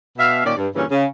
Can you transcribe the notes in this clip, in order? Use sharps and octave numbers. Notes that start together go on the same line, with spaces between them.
B2 E5 F5
A#2 D#3 C#4 D5
G2
G2 A#2 C#3 E3 A#3 C#4
C#3